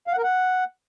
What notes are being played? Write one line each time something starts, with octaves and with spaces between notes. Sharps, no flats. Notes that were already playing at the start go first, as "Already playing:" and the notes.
F5
F#5
A#4
F#5